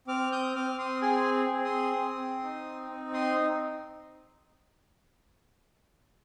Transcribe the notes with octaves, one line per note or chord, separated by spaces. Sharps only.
C4 D6 F6
D#6 G6
C4 D6 F6
C6 D#6
G#4 G#5 C6
C4
C6 D#6
C4
D#4
C4
C6 D#6